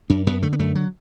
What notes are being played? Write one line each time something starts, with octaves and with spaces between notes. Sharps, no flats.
F#2 D4
F#2 B3
D3 A3
B3
F#2 A3
F#3